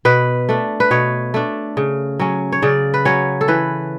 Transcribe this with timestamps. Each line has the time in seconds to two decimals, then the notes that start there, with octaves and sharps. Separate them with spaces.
0.05 B2 B4
0.49 A3 D4
0.80 B4
0.91 B2 C#5
1.34 A3 D4
1.77 C#3
2.19 F#3 C#4
2.52 C#5
2.62 C#3 D5
2.94 B4
3.05 F#3 C#4 C#5
3.41 A4
3.48 E3 B4